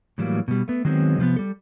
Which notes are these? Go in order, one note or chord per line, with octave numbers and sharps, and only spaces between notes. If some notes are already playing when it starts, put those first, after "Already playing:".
A2 E3 F#3 G3 A3 A#3
B2 G3
A3 B3
D#3 F#3 G#3 B3 C4
C3 F3 A#3 B3
G3 A4